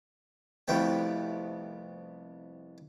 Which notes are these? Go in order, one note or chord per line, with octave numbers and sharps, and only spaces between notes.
C2 F2 A3 B3 G5